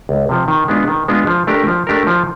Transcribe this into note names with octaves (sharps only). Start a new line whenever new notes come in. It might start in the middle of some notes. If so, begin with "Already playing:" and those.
C#2
C3 F3
D#3
G#3 B3 D4 F4
D#3
G#3 B3 D4 F4
F3
A3 D4 G4 A#4
F3
A3 D4 G4 A#4
F3